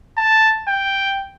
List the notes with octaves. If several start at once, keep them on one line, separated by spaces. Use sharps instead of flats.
A5
G5